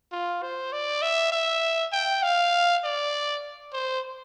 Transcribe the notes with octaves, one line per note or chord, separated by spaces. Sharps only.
F4
C5
D5
E5
E5
G5
F5
D5
C5